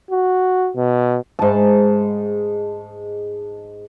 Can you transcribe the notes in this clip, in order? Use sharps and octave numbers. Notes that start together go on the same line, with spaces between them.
F#4
B2
G#2 A5